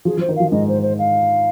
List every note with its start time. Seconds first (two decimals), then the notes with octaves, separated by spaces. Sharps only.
0.05 F3 G#4
0.17 F3 C5
0.29 D#3
0.36 F3 F5
0.52 G#2 G#3 D#5
0.68 C5
0.82 C5
0.99 F5